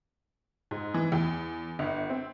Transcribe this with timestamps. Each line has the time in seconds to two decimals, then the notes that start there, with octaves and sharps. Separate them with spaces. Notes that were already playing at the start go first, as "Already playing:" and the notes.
0.71 G#2
0.94 E3
1.12 E2
1.79 G1
2.10 C4